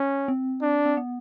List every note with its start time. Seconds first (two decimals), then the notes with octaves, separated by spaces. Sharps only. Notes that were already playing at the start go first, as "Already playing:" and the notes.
Already playing: C#4
0.28 C4
0.62 D4
0.86 C4
0.97 B3